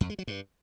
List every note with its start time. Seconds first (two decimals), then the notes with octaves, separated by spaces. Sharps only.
0.01 F2
0.10 G#3
0.19 F#3
0.27 G2